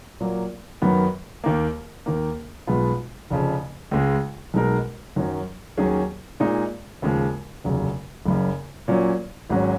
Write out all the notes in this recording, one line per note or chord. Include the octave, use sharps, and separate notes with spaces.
A#2 F#3 A#3
F#2 D#3 F#3 B3
D#2 D#3 A#3
D#2 D#3 A#3
B1 B2 G#3 B3 F4
F1 F2 C#3 F3
C#2 C#3 G#3
B1 B2 G#3 D#4 A#4
F#2 D#3 F#3 C#4
D#2 D#3 F#3 C#4 G#4
A#2 G#3 D#4 G#4
D#2 C#3 F3 G#3
F1 D#2 C#3 F#3
F#1 F#2 C#3
A#2 F#3 C#4
G#1 G#2 F#3 C#4 F#4